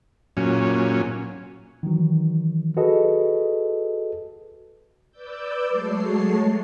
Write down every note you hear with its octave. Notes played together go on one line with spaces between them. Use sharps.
A#2 F#3 C#4
D#3 E3 F#3
F#4 G#4 A4 B4 D#5
B4 D5 D6 E6 G6
F#3 G#3 A3 C#5 A5 C7